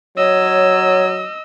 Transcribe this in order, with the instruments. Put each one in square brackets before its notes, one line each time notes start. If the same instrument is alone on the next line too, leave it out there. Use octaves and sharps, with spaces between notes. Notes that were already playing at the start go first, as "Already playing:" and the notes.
[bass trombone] F#3 [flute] C#5 [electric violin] D#5 E6